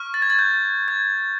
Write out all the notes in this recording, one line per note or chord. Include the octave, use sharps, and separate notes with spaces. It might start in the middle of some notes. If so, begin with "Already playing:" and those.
Already playing: C#6 F6
A6
G#6
A6
G6
G#6